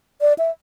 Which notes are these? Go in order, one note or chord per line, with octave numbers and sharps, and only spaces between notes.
D5
E5